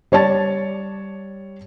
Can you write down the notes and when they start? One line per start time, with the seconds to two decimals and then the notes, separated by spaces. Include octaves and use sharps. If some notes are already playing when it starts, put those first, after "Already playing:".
0.12 G3 C#5 D5 A5 A6